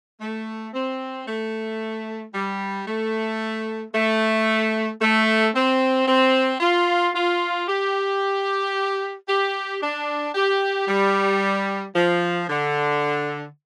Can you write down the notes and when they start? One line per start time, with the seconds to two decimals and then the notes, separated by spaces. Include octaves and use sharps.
0.20 A3
0.73 C4
1.26 A3
2.33 G3
2.86 A3
3.93 A3
5.00 A3
5.54 C4
6.07 C4
6.60 F4
7.14 F4
7.67 G4
9.27 G4
9.81 D4
10.34 G4
10.87 G3
11.94 F3
12.48 D3